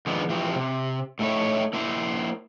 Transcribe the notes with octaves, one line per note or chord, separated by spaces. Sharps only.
D#3 F3 G#3 B3 D4
E3 F3 C4 G4
C3
A2 A3 D#4 E4 C#5
A#3 E4 C5